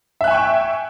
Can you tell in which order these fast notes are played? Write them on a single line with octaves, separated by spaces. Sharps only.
E5 F#6 G#5 C#6 G5